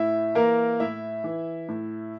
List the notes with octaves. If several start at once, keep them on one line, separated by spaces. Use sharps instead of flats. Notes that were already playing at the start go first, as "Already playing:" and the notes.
Already playing: A2 E4 E5
E3 A#3 A#4
A2 E4 E5
E3
A2